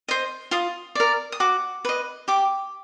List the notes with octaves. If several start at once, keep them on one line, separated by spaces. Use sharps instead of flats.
C5 D#5
F4 D#6
A#4 D5
D#6
F#4 D6
B4 D#5
G4 D6